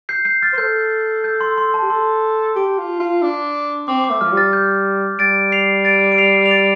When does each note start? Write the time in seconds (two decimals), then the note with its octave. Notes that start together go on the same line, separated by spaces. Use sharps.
0.09 G6 C7
0.25 G6 C7
0.43 F6 A6
0.53 C5
0.58 A4 G6
1.24 G6
1.41 C6
1.58 C6
1.74 A5
1.82 G4
1.90 A4 C6
2.56 G4
2.78 F4
3.00 F4
3.22 D4
3.88 C4 D6
4.04 D6
4.10 A3
4.21 F3 F6
4.32 G3
4.37 F6 A6
4.53 G6
5.19 G3 A6 D7
5.52 C7 F7
5.85 A6 D7
6.12 D7
6.18 C7 F7
6.46 F7
6.51 A6 D7